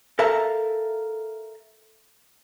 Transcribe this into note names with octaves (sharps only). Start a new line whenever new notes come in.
A4 A#4 E5 F5 A5 A#5